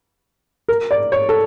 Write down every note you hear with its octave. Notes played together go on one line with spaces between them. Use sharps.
A#4
D5
C#5
A4